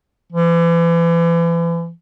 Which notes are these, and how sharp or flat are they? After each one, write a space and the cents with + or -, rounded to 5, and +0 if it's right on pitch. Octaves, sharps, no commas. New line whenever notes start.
E3 +40